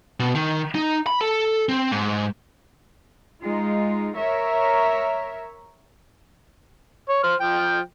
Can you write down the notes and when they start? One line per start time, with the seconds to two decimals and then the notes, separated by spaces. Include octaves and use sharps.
0.20 B2
0.35 D#3
0.75 D#4
1.07 B5
1.21 A4
1.69 C4
1.92 G#2
3.43 G#3 D#4 F4
4.15 A#4 C#5 E5
7.09 C#5
7.24 C5 F6
7.40 F3 G5